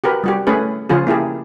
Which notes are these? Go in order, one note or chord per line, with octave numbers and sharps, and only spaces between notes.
F#4 G4 A#4 B4
G3 F#4 G4
A3 C#4 G#4 B4
C#3 F3 C#4 F4 G#4
A#3 E4 G4 G#4